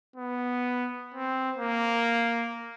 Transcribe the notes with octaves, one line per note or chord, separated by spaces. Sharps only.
B3
C4
A#3